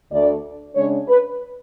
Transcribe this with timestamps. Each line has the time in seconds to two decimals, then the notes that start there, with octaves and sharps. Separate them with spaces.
0.10 D2 D3 A3 D5
0.75 C#3 G#3 D4 C#5
1.08 B4